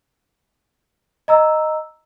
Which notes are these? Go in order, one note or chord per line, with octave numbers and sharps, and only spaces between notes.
D#5 A#5 E6